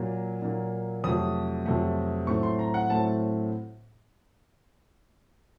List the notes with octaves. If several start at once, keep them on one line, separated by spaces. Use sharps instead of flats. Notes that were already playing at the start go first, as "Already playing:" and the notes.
Already playing: A#2 F#3 A#3
A#2 F#3 A#3
F2 C3 F#3 A3 D#6
F2 C3 F#3 A3
A2 F#3 A3 C4 C#6
C6
A#5
F#5
A2 F#3 A3 C4 A5